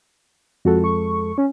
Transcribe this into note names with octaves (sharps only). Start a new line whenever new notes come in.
F2 G#3 F#4 A4
C#6
C#4